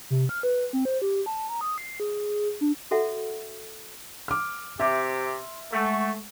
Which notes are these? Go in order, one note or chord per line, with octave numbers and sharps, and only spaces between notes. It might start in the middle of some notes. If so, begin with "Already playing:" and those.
C3
F6
B4
C4
C5
G4
A5
A#5
D#6
C7
G#4
D4
F#4 A4 E5 F#5
D6 F6
C3 G4 E5 C6
G#3 A3 F#5 C#6